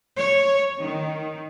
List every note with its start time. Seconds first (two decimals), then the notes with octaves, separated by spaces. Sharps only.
0.17 C#5
0.79 D#3